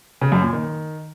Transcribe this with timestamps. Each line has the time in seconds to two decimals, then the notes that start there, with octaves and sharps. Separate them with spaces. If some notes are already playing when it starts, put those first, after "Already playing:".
0.21 C#3
0.32 F#2
0.42 A#2
0.53 D#3